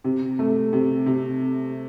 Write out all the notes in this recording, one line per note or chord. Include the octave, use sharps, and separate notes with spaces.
C3
A3
C3
C3